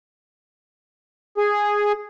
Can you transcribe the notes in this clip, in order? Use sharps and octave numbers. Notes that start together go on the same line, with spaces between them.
G#4